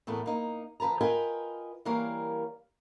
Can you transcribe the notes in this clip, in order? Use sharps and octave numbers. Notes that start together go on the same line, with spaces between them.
E2 A2 A3 B3 A#4
A#3 D#4
D#3 F3 B4 A5 A#5
F4 A#4 B4 D#5 G5 G#5
E3 G3 A#3 A#4 C#5 F5